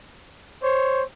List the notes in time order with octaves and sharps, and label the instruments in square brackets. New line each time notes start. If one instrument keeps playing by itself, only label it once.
[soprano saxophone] C5 [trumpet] C#5